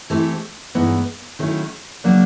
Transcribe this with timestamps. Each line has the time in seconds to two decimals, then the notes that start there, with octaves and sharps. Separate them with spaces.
0.10 E3 A3 C4 E4 G4
0.75 G2 E3 G#3 B3 D#4
1.39 D#3 F#3 A3 C#4 E4
2.04 C#3 F#3 A#3 D4